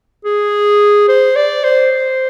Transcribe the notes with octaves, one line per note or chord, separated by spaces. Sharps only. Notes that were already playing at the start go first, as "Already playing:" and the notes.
G#4
C5
D5
C5